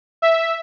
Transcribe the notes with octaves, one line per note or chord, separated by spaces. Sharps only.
E5